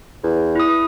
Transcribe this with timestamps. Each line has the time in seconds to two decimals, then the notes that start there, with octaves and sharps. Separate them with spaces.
0.24 E2
0.55 E4 D#6